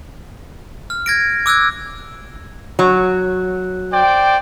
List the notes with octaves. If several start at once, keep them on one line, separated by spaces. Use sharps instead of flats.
F6
F#6 G#6 A#6 D7
D6 E6 F#6 G#6
F#3
C5 D5 G5